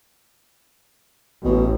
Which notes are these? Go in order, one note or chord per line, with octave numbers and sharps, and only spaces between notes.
A1 B2